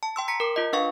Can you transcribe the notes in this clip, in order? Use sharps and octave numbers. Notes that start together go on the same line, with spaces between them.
A5
G5 C6 E6
A#5 B6 C#7
A#4 D6
F4 D#5
D4 B4 F5 C#6